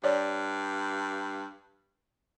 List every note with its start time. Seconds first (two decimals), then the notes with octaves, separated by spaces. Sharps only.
0.04 G2 C#5 D5